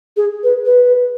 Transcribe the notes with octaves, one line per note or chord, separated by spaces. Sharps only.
G#4
B4
B4